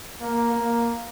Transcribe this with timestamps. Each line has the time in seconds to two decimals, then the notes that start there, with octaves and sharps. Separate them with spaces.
0.21 A#3
0.53 A#3